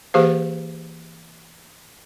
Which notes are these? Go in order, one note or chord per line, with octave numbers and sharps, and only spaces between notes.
E3 A#3 G4 G#4 C5 F5